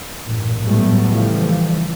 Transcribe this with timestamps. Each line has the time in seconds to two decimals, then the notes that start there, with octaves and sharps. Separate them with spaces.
0.24 A1 G2 A#2
0.63 A2 F#3 G3 A3 B3
1.06 C#3 E3 F3 G3 A3